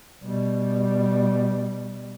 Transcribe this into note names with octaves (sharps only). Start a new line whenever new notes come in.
B2 G3